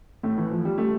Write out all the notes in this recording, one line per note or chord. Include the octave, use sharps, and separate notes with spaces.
A2 A3
E3
F3
G3
A3